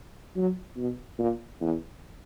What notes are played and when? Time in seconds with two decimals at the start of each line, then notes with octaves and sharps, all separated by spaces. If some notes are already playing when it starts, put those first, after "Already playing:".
0.36 F#3
0.77 B2
1.18 A#2
1.61 E2